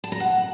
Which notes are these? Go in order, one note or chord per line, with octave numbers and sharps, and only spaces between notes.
A5
A#5
F#5